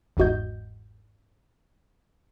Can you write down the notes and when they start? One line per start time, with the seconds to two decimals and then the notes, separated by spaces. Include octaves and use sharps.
0.17 G1 E2 G#2 F#4 D#5 G6